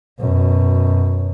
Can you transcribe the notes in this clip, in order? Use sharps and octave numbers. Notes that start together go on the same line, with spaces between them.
F#2 B2